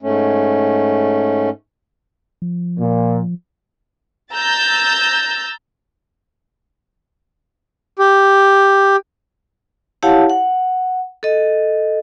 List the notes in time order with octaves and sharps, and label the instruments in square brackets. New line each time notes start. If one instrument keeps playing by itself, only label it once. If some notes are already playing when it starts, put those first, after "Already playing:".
[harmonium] G#2 A3 C#4
[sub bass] F3
[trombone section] A#2
[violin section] A#5 E6 G6 A6
[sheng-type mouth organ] G4
[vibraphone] E4 G4 C#5 F5 F#5 A5
F#5
A4 D#5